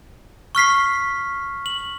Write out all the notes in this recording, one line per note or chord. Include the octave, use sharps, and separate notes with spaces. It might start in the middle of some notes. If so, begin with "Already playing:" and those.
C#6 F6 B6 C7
F#7